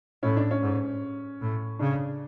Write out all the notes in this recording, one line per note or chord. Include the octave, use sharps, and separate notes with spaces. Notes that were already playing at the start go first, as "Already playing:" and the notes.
A2 C#4
D4
C#4
G#2
A2
C#3 D4